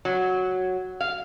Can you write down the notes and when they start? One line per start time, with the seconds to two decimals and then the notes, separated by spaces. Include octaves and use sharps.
0.05 F#3
1.01 F5